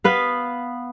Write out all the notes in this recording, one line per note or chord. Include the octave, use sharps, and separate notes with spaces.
B3 B4 F5